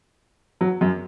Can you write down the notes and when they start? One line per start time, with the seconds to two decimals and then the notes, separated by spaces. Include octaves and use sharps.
0.61 F#3
0.81 F#2